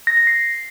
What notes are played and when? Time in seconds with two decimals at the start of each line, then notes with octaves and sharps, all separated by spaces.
0.07 A#6
0.17 A#6
0.27 C7